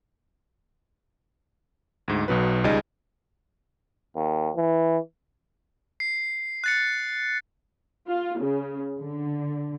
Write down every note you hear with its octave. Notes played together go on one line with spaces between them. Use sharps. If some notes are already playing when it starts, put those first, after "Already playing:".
D2 G#2
B1 B2 F#3 B4
C#2 G3 D#4 G#4 D#5 D#7
D#2
E3
C7
F#6 A6 C#7
F4
C#3
D3